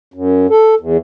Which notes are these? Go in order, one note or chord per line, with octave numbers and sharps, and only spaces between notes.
F#2
A4
E2